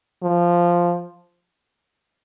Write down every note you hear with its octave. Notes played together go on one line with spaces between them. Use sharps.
F3